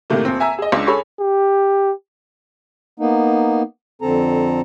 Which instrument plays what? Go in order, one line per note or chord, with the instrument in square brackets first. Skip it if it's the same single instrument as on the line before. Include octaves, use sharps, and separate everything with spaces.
[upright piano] A2 C3 D#3 A3 A#3
D#1 C4
E5 G#5 A#5 E6
G#4 D#5
C#2 C#3 D4
G#4 A4 C#5 B5 C#6
[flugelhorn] G4
[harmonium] A#3 B3 D#4
F2 D3 C4 A4 A#5